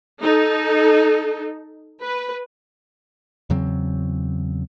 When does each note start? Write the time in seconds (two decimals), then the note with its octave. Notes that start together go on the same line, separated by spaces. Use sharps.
0.21 D#4 A4
2.00 B4
3.50 E2 C#3 F#3 C4